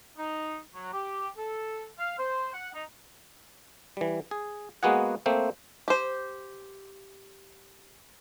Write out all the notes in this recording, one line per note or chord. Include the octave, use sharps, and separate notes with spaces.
D#4
F#3
G4
A4
F5
C5
F#5
D#4
E3 G3
G#4
G#3 A#3 B3 F#4 G#4 F#5
A3 A#3 C4 C5
G4 C5